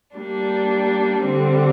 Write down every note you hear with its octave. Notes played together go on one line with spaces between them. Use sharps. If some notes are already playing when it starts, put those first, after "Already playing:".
G3 A#3 D4
D3 G3 C4